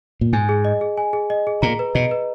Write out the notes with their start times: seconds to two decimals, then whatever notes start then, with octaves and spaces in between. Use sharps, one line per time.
0.21 A#2
0.33 G#2 G#5
0.49 G#4
0.65 D#5
0.81 G#4
0.97 G#5
1.13 G#4
1.30 D#5
1.47 G#4
1.62 A#2 A#5
1.79 B4
1.95 B2 D#5
2.11 B4